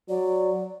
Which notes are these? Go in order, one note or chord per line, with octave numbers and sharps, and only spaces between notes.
F#3 D5